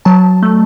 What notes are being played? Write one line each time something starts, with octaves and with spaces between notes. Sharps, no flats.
F#3 A5
A3